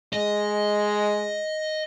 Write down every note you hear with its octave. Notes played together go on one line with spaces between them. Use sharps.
G#3 D#5